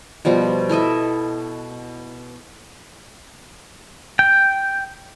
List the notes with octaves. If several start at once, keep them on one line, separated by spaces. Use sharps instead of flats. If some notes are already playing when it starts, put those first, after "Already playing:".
B2 F3 G3
E4 A4 D#5 E5
G5